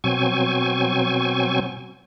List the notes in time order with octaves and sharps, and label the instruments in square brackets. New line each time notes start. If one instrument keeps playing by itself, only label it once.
[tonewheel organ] B2 F#3 C4 G#5 C#6